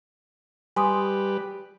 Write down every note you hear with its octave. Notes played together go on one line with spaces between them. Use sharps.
G3 G4 B4 G#5 C6 D#6